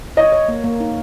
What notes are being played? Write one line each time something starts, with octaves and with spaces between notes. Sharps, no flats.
C#5 D#5
C#5
A#3
A#3
D#4